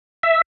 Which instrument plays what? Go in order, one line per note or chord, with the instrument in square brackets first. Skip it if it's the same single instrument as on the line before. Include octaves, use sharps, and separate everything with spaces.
[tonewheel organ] E5